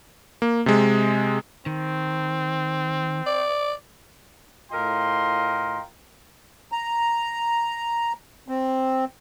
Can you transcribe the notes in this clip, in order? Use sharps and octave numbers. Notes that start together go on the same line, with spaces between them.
A#3
C3 G#3
D#3 C4
D5
A2 F4 A#4 D#5 G5 C6
A#5
C4